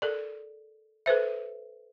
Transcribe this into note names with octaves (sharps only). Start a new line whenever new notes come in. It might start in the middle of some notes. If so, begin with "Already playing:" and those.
A4 A#4 D5
A4 B4 C5 E5